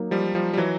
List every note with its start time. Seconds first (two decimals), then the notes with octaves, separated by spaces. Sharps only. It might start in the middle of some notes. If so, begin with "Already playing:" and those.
Already playing: F#3 A#3 D#4
0.11 F3 G3
0.35 F3 G3
0.53 G3
0.57 E3 F#3